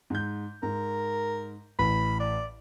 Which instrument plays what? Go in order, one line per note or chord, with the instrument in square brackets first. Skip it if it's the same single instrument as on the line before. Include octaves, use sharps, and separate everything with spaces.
[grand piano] G#2 G6
[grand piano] G#2 [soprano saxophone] A#4
[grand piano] A1 [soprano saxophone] B5
[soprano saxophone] D5